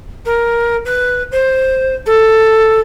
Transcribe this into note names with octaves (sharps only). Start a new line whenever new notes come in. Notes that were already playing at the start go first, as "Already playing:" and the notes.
A#4
B4
C5
A4